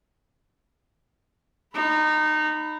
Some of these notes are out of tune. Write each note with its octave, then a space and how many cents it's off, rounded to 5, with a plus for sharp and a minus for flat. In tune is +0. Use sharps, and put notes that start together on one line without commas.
D#4 -20 B5 +0